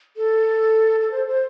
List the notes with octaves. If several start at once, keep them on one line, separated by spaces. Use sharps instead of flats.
A4
A4
C5
C5